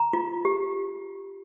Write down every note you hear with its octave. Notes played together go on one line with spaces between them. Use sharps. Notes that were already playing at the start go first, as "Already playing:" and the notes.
Already playing: A#5
F4
G4